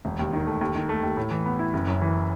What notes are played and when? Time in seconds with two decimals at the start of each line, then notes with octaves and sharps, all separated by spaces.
0.05 E1
0.19 D#2
0.33 D#3
0.47 A3
0.61 D#2
0.75 D#3
0.89 A3
1.03 D#2
1.17 A2
1.31 E3
1.46 B3
1.59 E4
1.73 F#1
1.87 F#2
2.02 E3